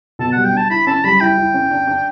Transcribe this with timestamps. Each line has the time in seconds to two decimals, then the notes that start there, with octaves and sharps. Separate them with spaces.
0.19 B2 A5
0.32 G3 F#5
0.45 G5
0.53 D4 A5
0.70 E4 B5
0.87 C#4 A5
1.04 G3 B5
1.20 E4 G5
1.38 E4
1.54 C#4
1.71 D4
1.87 D4